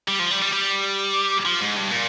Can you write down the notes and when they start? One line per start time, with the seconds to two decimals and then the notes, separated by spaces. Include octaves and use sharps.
0.08 G3
0.19 F3
0.31 G3
0.42 G3
0.53 G3
1.45 F3
1.61 G#2
1.76 G2
1.91 A#2